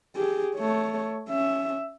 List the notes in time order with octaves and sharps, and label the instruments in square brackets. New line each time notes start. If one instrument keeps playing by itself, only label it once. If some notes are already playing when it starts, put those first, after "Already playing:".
[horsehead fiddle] G4 G#4
A3 C#5
C#4 E5